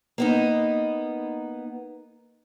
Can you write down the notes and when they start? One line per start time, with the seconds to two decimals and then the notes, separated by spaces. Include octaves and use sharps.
0.18 A#3 B3 D#4